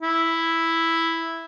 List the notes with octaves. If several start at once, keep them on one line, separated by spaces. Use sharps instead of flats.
E4